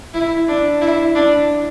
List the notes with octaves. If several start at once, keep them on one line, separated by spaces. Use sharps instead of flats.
E4
D4
E4
D4